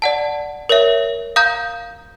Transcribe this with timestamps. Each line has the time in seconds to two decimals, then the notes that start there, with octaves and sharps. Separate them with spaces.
0.02 D5 F#5 A5
0.69 A#4 C#5 E5
1.36 F5 A#5 D#6 G6